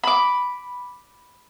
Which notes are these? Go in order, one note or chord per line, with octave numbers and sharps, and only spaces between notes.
B5 D6